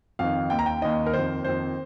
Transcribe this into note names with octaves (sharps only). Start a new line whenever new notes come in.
F2 D#3 F5
D#2 D#3 G5
A#5
G5
D#2 D#3 D#5
A#4
F2 D#3 C5
F2 D#3 C5